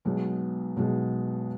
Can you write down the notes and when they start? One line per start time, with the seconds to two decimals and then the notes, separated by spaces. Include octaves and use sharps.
0.05 B1 B2 G#3
0.76 B1 B2 G#3